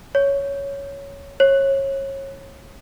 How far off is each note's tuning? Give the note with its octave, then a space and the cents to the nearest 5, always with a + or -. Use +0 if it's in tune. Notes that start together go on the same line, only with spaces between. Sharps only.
C#5 +5
C#5 -25